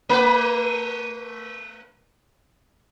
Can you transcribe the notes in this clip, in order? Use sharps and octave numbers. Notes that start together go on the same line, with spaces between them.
A3 B4